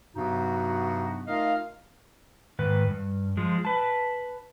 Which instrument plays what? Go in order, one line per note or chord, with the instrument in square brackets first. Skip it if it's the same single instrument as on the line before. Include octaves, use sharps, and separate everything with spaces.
[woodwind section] G2 C3 F#3 B3 D#4 F#4
A3 D#4 F4 A#4 D#5 F5
[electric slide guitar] G#2 D#3 B4
G2
F3 G#3
B4 A5